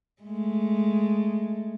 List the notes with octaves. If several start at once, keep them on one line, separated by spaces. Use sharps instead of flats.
G#3 A3